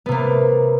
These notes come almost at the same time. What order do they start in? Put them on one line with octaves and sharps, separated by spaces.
B3 C3 A#3